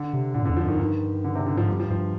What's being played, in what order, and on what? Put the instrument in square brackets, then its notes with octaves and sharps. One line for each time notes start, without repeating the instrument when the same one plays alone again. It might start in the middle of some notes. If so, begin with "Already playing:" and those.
Already playing: [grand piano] D3
[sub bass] C3
[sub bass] A#2 [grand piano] D3
[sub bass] G2
[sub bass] F2 [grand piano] D3
[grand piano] F3
[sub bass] G2 [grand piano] D#3
[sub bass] F2
[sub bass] G2 [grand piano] D#3
[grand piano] D3
C3
D3
[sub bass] G#2 [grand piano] F3
[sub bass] G2 [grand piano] G3
[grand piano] F3
[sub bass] G2 [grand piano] F3